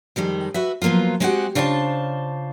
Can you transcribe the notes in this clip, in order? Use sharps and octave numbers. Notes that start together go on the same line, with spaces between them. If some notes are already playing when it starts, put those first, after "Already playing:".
F2 D#3 G3 G#3
F#4 B4 E5
F3 F#3 A#3 B3 F4
G#3 C4 D#4 F#4 G4 F#5
C#3 D4 F4 C5 F5 A5